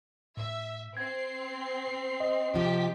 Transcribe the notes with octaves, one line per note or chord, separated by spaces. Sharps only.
A2 E5
C4 G#6 C7
D#5
C3 F3 G4 B6